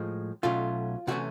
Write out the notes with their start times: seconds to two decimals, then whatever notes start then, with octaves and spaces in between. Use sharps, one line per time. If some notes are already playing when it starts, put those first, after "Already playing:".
Already playing: A2 F3 G#3
0.43 B1 B2 F#3 A3 C#4 F4
1.07 C3 E3 A3 C#4 F#4